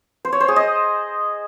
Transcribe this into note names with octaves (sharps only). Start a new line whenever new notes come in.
C5
C#5
C5
G#4
D#5